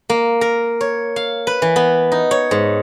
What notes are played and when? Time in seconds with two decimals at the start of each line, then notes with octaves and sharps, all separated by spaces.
0.09 A#3
0.41 A#4
0.81 C#5
1.16 F5
1.47 B4
1.62 E3
1.76 B3
2.12 D#4
2.31 C#5
2.51 G#2